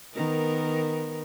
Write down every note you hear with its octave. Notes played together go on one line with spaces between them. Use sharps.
D#3 B3 A#4